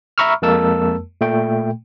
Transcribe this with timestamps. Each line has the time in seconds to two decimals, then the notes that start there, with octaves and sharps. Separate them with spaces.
0.18 E5 A#5 B5 C#6 E6 F6
0.42 F2 G#3 A#3 A#4 A5 E6
1.21 A#2 A3 G5